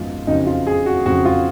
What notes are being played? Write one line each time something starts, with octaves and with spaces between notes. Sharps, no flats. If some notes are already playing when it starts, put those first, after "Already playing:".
Already playing: G#1 F#2 F3 G#3 B3 F4
F2 C#3 F#3 D#4
F4
G#4
F#4
F2 C#3 F#3 F#4
F4